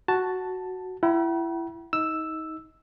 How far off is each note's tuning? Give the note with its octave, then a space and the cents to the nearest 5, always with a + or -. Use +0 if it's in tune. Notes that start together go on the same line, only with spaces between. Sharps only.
F#4 +0 A5 +0
E4 +25 F#5 +45 B5 -40
D#4 +25 E6 +0